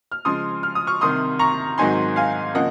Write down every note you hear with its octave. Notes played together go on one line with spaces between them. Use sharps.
F6
C#3 F3 G#3 C6 D#6
F6
D#6
C#6 F6
C2 C3 D#3 C6 D#6
A#5 C#6
G#2 D#3 F#3 C4 D#4 G#5 C6
F5 G#5
C#3 F3 A#3 D#5 F#5